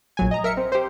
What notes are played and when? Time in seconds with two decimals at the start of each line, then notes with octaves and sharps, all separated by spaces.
0.17 A#1 F#3 G#5
0.31 D#5 A#5
0.44 A#4 E5 C#7
0.57 C4
0.72 G4 C5